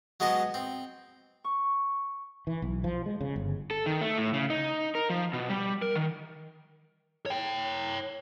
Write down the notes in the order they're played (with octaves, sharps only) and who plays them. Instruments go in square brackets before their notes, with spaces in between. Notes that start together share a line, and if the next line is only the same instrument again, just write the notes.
[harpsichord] F#3 G#3 B3 D#5 A5
C4
[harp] C#6
[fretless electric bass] E3
B1
F3
G#3
C#3
G1
[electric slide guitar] A4
D#3
A3
A2
C#3
D#4
A#4
F3
B2
G3
A#4
D#3
[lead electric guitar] C#5 G5